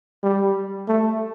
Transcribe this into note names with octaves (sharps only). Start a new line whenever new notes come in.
G3
A3